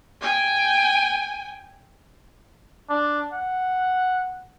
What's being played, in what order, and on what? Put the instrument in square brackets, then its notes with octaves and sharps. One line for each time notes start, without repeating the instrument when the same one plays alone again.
[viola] G5 G#5
[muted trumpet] D4
F#5